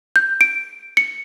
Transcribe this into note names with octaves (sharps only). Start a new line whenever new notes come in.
G6
D7
C#7